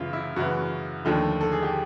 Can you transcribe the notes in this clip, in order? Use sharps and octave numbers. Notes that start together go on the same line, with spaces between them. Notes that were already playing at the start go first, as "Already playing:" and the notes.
Already playing: F#2 C#3 E3 F4
E4
F#2 C#3 E3 F#4
D#2 D3 F3 A3
A4
G#4
G4